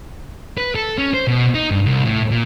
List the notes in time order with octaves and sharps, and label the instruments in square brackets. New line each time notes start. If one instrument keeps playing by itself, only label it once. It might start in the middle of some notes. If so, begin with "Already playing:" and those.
[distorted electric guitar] B4
A4
C#4
C5
B2
D#4
G2
C2
A2
A#2